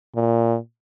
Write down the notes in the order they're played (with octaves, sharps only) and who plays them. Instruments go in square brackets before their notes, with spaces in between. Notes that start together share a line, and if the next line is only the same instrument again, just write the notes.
[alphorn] A#2